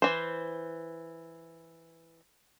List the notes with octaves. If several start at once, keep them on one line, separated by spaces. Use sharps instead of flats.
E3 C5